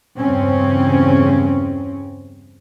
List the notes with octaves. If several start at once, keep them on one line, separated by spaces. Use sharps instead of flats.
E2 G2 C#3 C4 C#4